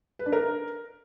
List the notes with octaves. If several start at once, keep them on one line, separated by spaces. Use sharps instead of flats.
B4
D4
A#4